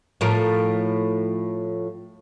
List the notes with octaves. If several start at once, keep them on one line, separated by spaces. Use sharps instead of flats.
A2 F3 A#4